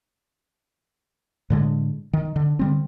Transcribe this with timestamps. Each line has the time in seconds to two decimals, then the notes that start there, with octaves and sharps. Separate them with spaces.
1.50 A2 D3 G#3
2.13 D#3
2.36 D3
2.59 D3 G3 C4